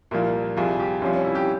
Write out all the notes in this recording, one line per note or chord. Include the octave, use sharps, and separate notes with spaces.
C2 A#2 F3 A#4
C2 C3 F3 G#4
G4
C2 C3 F3 C#4
C#4
E4
G4